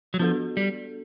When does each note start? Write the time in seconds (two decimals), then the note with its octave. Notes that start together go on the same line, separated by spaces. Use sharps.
0.14 F#3
0.19 F3 B3 D4 F#4 A4
0.57 G3